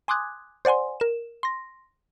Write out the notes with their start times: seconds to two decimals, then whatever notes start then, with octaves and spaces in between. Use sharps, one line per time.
0.08 G#5 C6 D6 D#6 F#6 G#6
0.65 C5 D5 F#5 G#5 C6
1.00 A#4 E7
1.43 C6 A#6